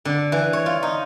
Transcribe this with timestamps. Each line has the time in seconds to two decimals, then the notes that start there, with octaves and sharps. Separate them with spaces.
0.05 D3
0.32 E3
0.53 C#5
0.66 F4
0.83 D#4